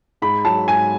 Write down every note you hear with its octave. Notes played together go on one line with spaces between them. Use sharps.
G#2 B5
F#3 A5
G#2 G#5